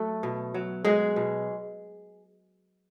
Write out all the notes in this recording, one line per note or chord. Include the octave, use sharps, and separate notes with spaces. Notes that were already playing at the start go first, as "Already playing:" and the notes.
Already playing: F#3 A3 A4
B2
F#3
F#3 G#3 G#4
B2